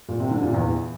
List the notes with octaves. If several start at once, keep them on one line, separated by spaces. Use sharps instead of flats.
A#2
C3
D3
A#2
E2